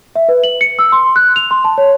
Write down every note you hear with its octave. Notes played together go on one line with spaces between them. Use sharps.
E5
B4
F#7
C#7
E6
C6
F#6
F7
C6
A5
C#5